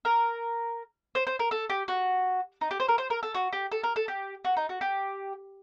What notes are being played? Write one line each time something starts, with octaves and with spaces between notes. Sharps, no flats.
A#4
C5
C5
A#4
A4
G4
F#4
D#4
G4
C5
A#4
C5
A#4
A4
F#4
G4
A4
A#4
A4
G4
F#4
D#4
F#4
G4